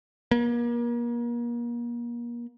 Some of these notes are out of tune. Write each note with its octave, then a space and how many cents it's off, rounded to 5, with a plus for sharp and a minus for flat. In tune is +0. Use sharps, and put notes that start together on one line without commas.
A#3 +35